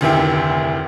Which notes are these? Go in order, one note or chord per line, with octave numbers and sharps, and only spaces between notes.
F1 D2 D#3 E4 G5